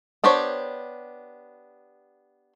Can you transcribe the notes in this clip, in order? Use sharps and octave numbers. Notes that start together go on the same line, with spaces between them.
B3 D4 G4 C5 C#5